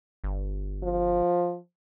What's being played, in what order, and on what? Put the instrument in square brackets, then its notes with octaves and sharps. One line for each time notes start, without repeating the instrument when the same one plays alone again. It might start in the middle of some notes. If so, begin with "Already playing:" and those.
[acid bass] G1
[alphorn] F3